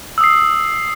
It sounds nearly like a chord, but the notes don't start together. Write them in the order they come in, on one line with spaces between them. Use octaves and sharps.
E6 D#6 C7